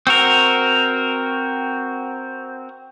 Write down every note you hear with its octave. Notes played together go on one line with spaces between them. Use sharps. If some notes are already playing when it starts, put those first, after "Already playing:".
C4 F#4 A#4